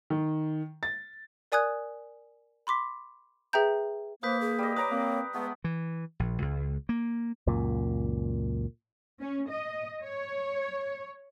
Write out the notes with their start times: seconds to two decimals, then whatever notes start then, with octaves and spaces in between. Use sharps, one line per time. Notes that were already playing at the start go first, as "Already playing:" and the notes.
0.10 D#3
0.83 A6
1.52 A#4 D5 G#5 D#6 F#6 G#6
2.67 B5 C6 D6 B6
3.53 G#4 B4 E5 G5 A#5 G6
4.23 A#3 B4 C5 D#6 G6 B6
4.41 G#4
4.59 G3 D#5
4.76 B4 C#5 A#5 D6 D#6
4.90 A#3 C4
5.34 G#3 A3 B3 B4
5.64 E3
6.20 A#1
6.42 C#2
6.89 A#3
7.47 C#2 F#2 A#2
9.21 C#4
9.50 D#5
10.04 C#5